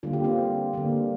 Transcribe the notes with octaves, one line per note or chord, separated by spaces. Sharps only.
D3 G3 A#3 F4
G4
C4 F4
D3 G3 A#3